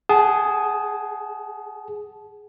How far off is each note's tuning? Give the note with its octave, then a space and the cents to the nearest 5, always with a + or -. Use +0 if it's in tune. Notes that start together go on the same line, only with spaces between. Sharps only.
G#4 +0 F#5 +20 A5 -30